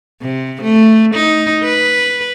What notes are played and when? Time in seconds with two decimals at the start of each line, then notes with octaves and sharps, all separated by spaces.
0.21 C3
0.62 A3
1.15 D#4
1.64 B4